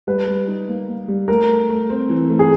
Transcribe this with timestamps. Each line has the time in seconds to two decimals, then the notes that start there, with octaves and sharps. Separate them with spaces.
0.07 G3 B4
0.28 G3
0.48 D#4
0.68 A#3
0.88 A#3
1.08 G3
1.28 A3 A#4
1.49 A3
1.69 A3
1.90 C4
2.09 E3
2.30 A3
2.39 G#4